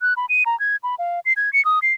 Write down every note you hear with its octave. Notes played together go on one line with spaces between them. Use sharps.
F#6
B5
D#7
A#5
G#6
B5
F5
C7
G#6
C#7
D#6
C7